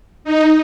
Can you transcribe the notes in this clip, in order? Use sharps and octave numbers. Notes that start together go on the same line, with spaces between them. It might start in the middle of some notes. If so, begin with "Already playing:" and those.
D#4